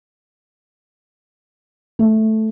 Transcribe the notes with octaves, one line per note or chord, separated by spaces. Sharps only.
A3